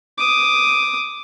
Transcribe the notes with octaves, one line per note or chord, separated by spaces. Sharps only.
D6 D#6